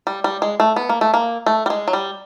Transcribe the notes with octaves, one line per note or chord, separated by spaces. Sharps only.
G3
G3
G#3
A3
B3
A#3
A3
A#3
A3
G3
G#3
F#3
G3